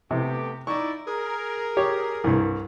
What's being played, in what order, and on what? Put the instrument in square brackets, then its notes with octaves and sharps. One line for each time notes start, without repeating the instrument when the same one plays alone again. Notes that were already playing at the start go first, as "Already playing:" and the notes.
[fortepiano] C3 [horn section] A3 B3 G4
[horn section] D#4 E4 D5 [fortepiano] C#6
[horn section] G#4 A#4
[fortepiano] G4 C#5
C2 G2